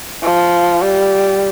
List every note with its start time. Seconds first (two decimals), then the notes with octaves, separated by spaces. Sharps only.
0.23 F3
0.82 G3